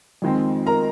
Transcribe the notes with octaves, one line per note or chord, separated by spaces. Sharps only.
F2 D#3 G#3 C4
A#4 A#5